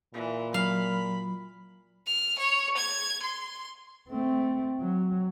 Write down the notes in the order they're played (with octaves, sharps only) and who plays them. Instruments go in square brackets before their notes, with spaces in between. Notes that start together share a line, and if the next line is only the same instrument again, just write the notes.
[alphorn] A#2 [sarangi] E3
[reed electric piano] F#3 [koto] F5 [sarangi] B5
[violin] F6
C#5
G#6
C6
[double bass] A3 C4
F#3